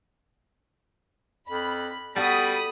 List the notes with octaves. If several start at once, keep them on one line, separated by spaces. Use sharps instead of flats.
F2 B5
G3 B3 F#4 A4 B5 D#6